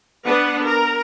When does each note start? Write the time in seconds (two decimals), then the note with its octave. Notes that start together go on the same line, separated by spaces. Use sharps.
0.25 B3 D4 B4 F#5
0.65 A#4 A#5